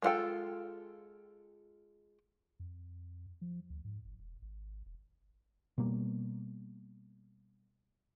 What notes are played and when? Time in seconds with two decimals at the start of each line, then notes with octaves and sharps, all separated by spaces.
0.02 G#3 A#3 F4 A4 G5
2.60 F2
3.41 F3
3.70 D2
3.85 G#2
4.05 G1
4.19 E1
4.42 G#1
4.86 E1
5.78 B2 G3 A#3